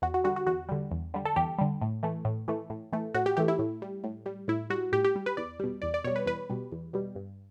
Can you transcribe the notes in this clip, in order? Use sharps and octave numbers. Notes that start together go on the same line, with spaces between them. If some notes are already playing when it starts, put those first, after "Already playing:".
E2 F#4
F#4
D3 G3 F#4
F#4
E2 F#4
D3 G3
E2
D3 G3
A4
E2 G4
D3 G3
A2
E3 A3
A2
E3 A3
A2
E3 A3
A2 F#4
G4
E3 A3 G4
E4
A2
G3
A2
G3
A2 E4
G3 F#4
A2 G4
G4
G3
B4
E2 D5
B2 G3
E2 D5
D5
B2 G3 C#5
B4
E2 B4
B2 G3
E2
B2 G3
G2